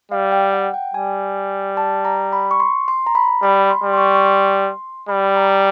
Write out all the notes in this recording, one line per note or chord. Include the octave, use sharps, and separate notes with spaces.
G3 F5
G5
F#5
G5
G3 G#5
A5
A#5
B5
C#6
C6
C6
A#5
B5
G3 B5
C6
G3
C6
C#6
C#6
C6
G3 B5
A#5